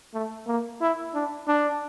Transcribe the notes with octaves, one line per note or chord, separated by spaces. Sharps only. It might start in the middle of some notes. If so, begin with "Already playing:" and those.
A3
A#3
E4
D4
D4